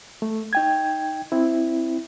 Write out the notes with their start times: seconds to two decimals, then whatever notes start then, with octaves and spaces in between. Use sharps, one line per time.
0.22 A3
0.53 D#4 G5 G#6
1.32 C4 E4